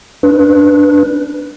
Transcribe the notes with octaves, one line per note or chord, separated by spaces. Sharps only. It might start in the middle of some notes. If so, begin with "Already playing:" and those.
D4 B4